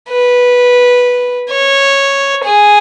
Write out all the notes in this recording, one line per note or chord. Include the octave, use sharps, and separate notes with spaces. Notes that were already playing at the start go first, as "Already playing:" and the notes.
B4
C#5
G#4